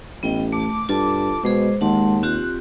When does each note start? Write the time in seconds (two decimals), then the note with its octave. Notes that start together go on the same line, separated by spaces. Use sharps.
0.23 A1 B3 D#5 G5
0.52 A3 D6
0.89 G2 F4 A4 A5
1.44 B2 G#3 G#4 C5 D6
1.81 D#2 G#3 F#5 A5 C6
2.23 C4 F4 G4 F#6